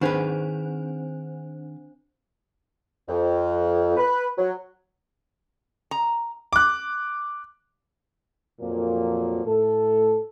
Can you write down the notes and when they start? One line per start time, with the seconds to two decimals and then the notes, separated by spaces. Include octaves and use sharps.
0.01 D#3 C4 D4 G#4 B4 C5
3.09 F2
3.97 B4
4.38 F#3
5.91 A#5
6.53 D6 F#6
8.61 F2 A#2 F3 F#3 A#3
9.46 A2 A3 A4